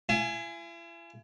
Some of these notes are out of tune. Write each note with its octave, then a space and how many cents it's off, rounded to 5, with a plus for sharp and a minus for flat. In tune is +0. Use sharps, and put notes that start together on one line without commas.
E4 +45 G#5 +0